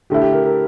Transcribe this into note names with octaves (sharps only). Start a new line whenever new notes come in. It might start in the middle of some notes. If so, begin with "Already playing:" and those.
D3 A3 E4 G4
G4
A#4
A#4